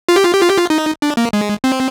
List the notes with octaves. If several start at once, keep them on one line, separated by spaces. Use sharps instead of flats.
F4
G4
F4
G4
F4
G4
F4
D#4
D4
A#3
G#3
C4